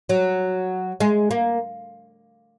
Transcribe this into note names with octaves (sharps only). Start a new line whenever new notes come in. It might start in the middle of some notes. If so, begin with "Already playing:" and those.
F#3
G#3
A#3